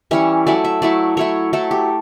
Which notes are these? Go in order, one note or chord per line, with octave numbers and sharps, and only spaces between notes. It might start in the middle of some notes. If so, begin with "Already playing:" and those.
E3 G3 C#4 E4 C#5
F#3 A3 E4 D5
E5
F#3 A3 E4 D5
F#3 A3 E4 C#5
F#3 A3 E4 A4
G4